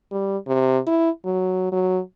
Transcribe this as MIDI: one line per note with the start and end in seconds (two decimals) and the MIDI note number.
0.12 0.37 55
0.47 0.79 48
0.87 1.10 64
1.25 1.71 54
1.72 1.99 54